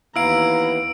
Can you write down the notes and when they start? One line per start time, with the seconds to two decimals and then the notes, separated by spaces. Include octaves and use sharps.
0.16 D#2 E3 B3 E4 F5 A#5 E6 D7